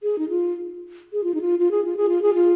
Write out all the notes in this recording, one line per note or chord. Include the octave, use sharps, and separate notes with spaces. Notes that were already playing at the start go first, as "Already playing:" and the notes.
G#4
D#4
F4
G#4
F4
D#4
F4
F4
G#4
F4
G#4
F4
G#4
F4